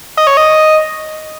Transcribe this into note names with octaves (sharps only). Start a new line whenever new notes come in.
D#5
C#5
D#5